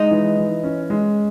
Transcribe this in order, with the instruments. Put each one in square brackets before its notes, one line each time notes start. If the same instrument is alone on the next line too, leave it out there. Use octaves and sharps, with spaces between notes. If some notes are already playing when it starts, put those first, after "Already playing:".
Already playing: [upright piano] G#3 [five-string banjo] D#4
[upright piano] E3
E3
C#4
G#3